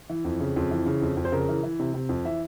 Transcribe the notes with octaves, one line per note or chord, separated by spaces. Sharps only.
E3
F2
C#3
F2
E3
C#3
F2
F2
C5
C#3 A#4
E3
E3
C3
C3
F2
E3 E5